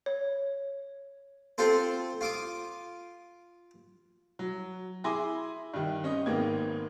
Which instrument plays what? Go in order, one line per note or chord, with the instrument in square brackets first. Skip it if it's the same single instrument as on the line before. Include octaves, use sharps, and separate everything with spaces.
[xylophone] C#5
[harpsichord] C4 F4 A4 C5
F4 D6 D#6
[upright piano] F#3
E4 G#4 G#5 C6 D6 A#6
G2 D#3 G3
C4 C#4 D#5
G#1 G#2 D#3 A#3 B3 G#6